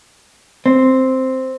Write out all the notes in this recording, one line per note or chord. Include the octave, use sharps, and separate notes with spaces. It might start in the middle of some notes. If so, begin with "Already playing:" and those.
C4